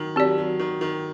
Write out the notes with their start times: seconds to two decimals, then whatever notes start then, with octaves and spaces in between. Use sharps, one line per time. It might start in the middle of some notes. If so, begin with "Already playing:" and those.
Already playing: D#3 F#3
0.16 F#3 C4 G4 D5
0.38 F#3
0.59 D#3
0.81 D#3